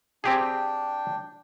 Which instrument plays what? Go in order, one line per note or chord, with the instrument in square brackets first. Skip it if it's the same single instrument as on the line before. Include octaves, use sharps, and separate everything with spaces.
[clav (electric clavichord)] C4 G4 G#4 [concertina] D4 G5